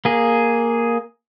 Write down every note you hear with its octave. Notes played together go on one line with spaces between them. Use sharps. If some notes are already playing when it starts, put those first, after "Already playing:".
A#3 G#4